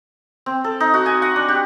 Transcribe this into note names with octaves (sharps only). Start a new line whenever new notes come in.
C4
A4
D#4
F#4
G#5
F#5
D4
G4